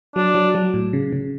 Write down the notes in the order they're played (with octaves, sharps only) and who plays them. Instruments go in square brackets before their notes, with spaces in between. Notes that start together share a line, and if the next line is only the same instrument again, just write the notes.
[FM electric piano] F#3 [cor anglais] D4
[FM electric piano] F#3
F#3
A2
C#3
C#3